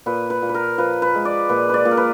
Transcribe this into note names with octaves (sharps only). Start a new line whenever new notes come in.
A#2 B4
B4
A#2
B4
A#4
F3 B4
B4
G#3
D5
A#2 B4
B4 D5
A#2
A#4
B4